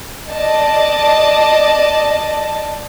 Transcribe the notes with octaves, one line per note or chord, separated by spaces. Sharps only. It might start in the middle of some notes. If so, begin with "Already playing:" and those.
D5 D#5 A5